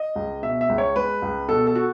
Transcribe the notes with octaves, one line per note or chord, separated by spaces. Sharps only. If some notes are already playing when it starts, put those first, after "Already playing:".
Already playing: D#5
C#2
B2 E5
E5
C#2
C#5
G#3 B4
C#2
B2 A4
A4
F#4